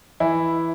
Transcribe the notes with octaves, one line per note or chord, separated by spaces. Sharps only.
E3 E4